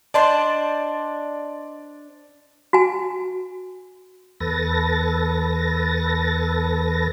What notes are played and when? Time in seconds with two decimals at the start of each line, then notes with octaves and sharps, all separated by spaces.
0.14 D4 C5 D5 D#5 A5 C6
2.73 F#4 G#5
4.40 E2 A4 B4 A6 A#6